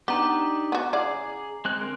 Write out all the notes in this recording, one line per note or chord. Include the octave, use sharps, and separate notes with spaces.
B3 D4 D#4 G4 A#5 D6
B3 F#4
C#3 E4 G#4 D5
G#3 C4 F#6
D3 C4 A#4